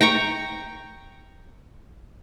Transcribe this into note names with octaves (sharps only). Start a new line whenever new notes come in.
G5 A#5 C#6